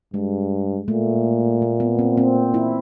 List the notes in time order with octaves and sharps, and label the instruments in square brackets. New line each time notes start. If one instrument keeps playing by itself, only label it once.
[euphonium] G2 [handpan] G#3
[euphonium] A#2 [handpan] A3
[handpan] A#3
B3
C4
C4
E4